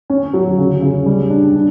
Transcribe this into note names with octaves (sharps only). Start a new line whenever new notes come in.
C#4
F#3
C#3
C#3
G3
D4
D4